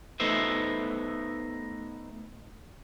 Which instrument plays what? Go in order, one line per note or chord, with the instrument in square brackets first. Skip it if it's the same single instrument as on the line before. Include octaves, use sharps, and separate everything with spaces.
[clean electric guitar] A3 B3 D#4 C5 E5